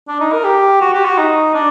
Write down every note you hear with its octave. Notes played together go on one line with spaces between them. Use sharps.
D4
D#4
A#4
G4
F#4
G4
F#4
D#4
D4